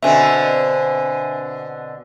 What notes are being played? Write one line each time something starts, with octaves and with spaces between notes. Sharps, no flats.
B2 D3 C4 E5 G#5